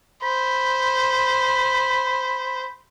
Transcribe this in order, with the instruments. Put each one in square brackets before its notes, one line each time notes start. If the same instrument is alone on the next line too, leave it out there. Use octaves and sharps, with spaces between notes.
[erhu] C5 [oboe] B5